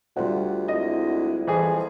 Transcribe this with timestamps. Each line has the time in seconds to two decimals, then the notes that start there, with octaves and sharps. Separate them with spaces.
0.16 D2 G3 F4 F#5
0.68 G#3 C4 E4 D#5
1.47 F2 E3 G#4